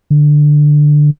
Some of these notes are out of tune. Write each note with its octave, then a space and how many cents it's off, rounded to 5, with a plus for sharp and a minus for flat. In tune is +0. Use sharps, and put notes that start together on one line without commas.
D3 +10